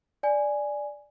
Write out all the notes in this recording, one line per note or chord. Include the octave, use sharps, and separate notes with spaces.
D5 G#5